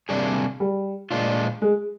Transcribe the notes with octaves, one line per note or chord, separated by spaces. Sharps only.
C3 G3 A#3 D4 G#4
G3
A#2 G#3 D4 F4
G#3